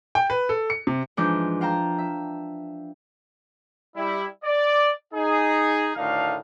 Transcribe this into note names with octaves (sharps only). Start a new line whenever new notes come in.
G5
B4
A4
C#7
C3
G#2 E3 F3 D4 D6 G6
F5 G5 A5 A#5
E5
G3 E4
D5
D#4 G#4
D2 A2 D#3 D4 D#4 F5